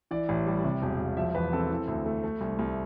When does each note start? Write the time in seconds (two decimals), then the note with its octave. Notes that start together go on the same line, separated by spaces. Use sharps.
0.11 E3 D5
0.29 A1
0.46 G3
0.64 C3
0.82 E1
1.00 E1
1.17 F3 E5
1.35 E2 B4
1.53 C4 A4
1.70 E3
1.88 D2
2.06 A3
2.24 A3
2.41 C2
2.59 C2